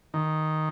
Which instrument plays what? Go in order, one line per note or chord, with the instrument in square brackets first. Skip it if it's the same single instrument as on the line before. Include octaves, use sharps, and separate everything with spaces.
[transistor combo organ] D#3